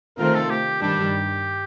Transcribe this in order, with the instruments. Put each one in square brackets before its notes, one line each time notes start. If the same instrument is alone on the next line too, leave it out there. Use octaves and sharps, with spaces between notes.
[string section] C3 D#3 A3 C4 F4 [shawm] A#4
[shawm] A4
G4
[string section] G2 D#3 G3 D4 [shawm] G4